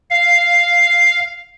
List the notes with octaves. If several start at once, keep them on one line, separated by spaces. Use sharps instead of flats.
F5